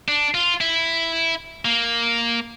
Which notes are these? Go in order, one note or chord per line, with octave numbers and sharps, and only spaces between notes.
D4
F4
E4
A#3